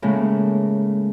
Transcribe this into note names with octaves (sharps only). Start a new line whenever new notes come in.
A2 C#3 G#3 A#3